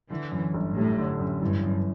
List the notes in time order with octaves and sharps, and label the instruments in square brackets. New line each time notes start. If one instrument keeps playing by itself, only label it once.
[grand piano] D3 [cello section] E3
[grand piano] F#2
G1
[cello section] A2 [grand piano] G3
[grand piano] D3
F#2
[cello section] G2 [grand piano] E3
[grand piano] F#2